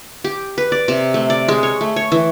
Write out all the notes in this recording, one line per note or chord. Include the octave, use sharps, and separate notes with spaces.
G4
B4
D5
C3
A3
D5
G#3
C#5
A3
C#5
E3